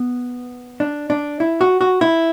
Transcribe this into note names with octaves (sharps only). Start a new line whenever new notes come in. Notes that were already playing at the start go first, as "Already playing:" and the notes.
Already playing: B3
D4
D4
E4
F#4
F#4
E4